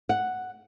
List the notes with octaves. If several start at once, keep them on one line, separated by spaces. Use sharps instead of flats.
F#5